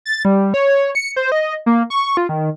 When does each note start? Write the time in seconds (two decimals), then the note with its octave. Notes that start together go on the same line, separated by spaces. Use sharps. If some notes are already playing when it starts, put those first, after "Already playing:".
0.06 A6
0.25 G3
0.54 C#5
0.95 C#7
1.16 C5
1.32 D#5
1.66 A#3
1.90 C#6
2.17 F4
2.29 D#3